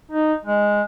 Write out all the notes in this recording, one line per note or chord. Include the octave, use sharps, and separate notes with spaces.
D#4
G#3